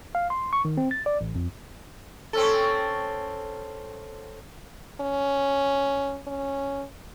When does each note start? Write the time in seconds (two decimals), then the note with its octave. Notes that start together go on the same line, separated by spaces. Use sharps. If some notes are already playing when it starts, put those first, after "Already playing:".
0.15 F5
0.30 C6
0.53 C#6
0.65 D#3
0.77 C4
0.91 A6
1.06 D5
1.21 A1
1.35 F2
2.33 C4 C#4 A4
5.01 C#4
6.27 C#4